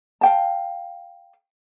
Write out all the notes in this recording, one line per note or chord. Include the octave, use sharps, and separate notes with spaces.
F5 G5 A5